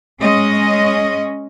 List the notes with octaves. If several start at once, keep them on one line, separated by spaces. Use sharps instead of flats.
G#3 C#4 D#5